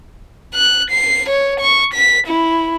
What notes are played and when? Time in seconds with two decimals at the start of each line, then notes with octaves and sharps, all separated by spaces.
0.55 F#6
0.90 C7
1.29 C#5
1.60 C#6
1.93 B6
2.27 E4